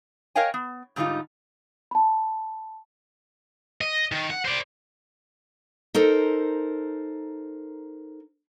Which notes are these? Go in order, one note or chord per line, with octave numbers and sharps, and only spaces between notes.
A#4 C#5 D#5 F5 G5 G#5
B3
G#2 D3 F#3 G3 D#4 F4
A5 B5
D#5
D#3
F#5
C5 D5
D#4 A4 A#4 C5